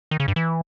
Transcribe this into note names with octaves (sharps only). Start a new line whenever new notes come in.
D#3
C#3
G2
E3